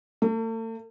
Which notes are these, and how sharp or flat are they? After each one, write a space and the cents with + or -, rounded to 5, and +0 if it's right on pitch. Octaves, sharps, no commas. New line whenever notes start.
A3 +40